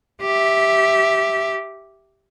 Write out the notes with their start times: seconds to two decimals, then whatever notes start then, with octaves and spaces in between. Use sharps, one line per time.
0.22 G4 E5